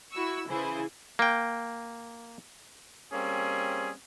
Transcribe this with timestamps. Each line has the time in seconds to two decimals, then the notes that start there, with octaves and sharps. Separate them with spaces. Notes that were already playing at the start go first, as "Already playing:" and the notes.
0.13 E4 F#4 C#6 E6
0.48 C#3 E3 E4 G#4 C5
1.19 A#3 G5
3.12 G3 A#3 C4 C#4 G#4